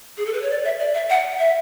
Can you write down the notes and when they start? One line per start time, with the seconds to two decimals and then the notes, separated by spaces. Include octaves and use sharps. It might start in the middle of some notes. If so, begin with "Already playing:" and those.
0.17 G#4
0.26 A4
0.33 B4
0.42 C#5
0.50 D5
0.64 E5
0.79 D5
0.94 E5
1.10 F#5
1.39 E5